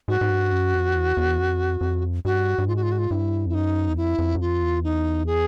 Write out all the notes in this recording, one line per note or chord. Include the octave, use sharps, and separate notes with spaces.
G#2 F#4
G#2
G2
F#2
F2
E2
E2
F2
F2
G2 F#4
G2
G#2 F4
F#4
F4
F#4
F4
G2 E4
F2
E4
F#2 D#4
E2
F2 E4
F2
F#2
F2 F4
E2
D#4
G#4